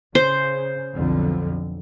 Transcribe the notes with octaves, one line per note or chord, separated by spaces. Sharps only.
C#3 C5
B1 F2 D3